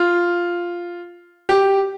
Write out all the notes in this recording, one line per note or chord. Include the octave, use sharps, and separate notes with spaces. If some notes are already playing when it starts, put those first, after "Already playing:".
Already playing: F4
G4